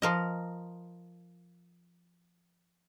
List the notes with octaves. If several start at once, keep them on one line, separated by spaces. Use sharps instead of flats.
F3 A#4 D#5